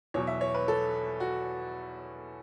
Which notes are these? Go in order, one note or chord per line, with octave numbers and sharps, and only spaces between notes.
E2 B2 F#3 C#5
E5
C#5
B4
A4
F#4